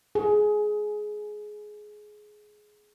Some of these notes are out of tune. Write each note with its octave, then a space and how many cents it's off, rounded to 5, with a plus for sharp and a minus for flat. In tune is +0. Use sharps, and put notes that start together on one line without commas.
G#4 +15